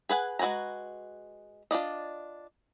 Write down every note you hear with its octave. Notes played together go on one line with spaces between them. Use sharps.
G#4 B4 F#5 G#5
G#3 F#4 B4 G#5 A#5
D4 F4 D5 D#5